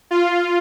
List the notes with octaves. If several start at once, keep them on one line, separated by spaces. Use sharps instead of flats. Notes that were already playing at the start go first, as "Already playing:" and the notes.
F4